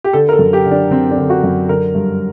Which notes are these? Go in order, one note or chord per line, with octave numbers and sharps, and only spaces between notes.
G4
D3 A4
A#4
A4
F#2
G4
D3
D4
F#2 C4
D4
D3
F#4
F#2
D3 A#4
G2